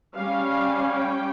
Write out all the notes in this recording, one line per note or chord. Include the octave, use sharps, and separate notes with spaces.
G3 C#4 F5
G5